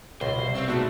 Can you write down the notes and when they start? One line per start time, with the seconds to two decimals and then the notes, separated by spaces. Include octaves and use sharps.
0.21 C#2 B2 C5
0.39 C2
0.55 C4 F5 C#6 E6
0.68 D#2 B2 G#3 A3 B3 D4 F#4